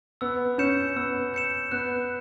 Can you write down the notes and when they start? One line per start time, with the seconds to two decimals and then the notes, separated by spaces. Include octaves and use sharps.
0.21 B3 E6
0.58 C#4 G6 C#7 E7
0.96 B3 E6
1.34 G6 C#7 E7
1.71 B3 F#6